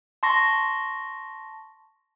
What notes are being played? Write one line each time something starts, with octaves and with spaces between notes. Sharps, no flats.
A5 C6 C#6 A#6